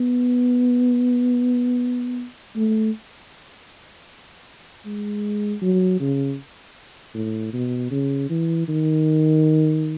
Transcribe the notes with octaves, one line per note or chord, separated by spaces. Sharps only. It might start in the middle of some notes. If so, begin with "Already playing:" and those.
Already playing: B3
A3
G#3
F#3
C#3
A2
B2
C#3
E3
D#3